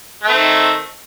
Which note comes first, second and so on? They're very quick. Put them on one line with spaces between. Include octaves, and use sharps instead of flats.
A3 C4 D#3